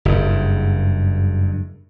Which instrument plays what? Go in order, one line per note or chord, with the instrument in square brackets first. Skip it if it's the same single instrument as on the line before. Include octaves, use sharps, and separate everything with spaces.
[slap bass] F#1 G2